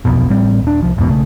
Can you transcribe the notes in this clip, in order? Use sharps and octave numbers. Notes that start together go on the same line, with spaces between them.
D#1 B1 F2 B2
A1 A2 G3 C4
D#1 D4
C2 F3
G1 E2 G#2 B2
B1 C#3 A3